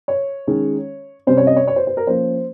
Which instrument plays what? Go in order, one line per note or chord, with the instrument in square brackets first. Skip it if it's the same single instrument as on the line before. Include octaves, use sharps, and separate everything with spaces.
[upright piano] C#5
D#3 G#3 C#4
C3 G3 C#4 C5
C#5
D#5
C#5
C#5
C5
C5
A#4
F3 A#3 C#4 C5